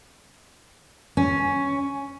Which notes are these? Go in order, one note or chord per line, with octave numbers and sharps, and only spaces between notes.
C#4